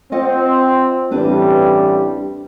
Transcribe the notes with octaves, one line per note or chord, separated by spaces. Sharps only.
C4 F4 D#5 F#5
A1 G3 C4 D4 B4